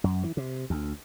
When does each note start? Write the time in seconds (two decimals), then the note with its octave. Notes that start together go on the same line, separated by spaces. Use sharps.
0.04 F#2
0.23 E3
0.37 C3
0.70 D2